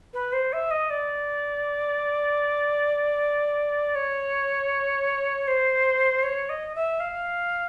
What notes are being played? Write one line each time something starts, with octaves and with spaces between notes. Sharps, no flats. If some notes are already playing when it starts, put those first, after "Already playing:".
B4
C5
E5
D#5
D5
C#5
C5
C#5
D#5
E5
F5